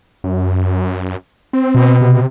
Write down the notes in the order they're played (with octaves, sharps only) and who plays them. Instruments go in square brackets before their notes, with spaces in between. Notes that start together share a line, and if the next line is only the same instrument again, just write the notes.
[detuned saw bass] F#2
C4
[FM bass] B2 [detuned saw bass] C4
[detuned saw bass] C3